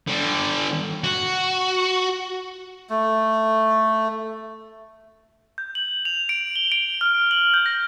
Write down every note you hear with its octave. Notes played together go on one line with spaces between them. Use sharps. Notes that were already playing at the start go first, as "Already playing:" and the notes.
D3 G3
F#4
A3
G6
F#7
F7
D7
G7
D7
F6
F#7
G6
A#6